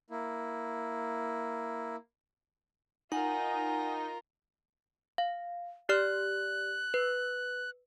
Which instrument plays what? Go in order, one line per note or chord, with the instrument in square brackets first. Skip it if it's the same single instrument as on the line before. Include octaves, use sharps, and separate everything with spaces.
[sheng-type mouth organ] A#3 E4
[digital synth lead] D#4 [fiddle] F4 A#4 [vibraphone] F#5 [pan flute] G#5
[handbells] F5
[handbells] G4 D5 F6 [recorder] F#6
[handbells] B4